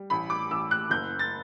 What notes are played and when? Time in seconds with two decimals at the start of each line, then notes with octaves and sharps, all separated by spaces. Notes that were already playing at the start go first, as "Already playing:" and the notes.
Already playing: G3
0.10 A1 B5
0.30 D6
0.51 A1 E6
0.71 F#6
0.90 F#1 G6
1.19 A6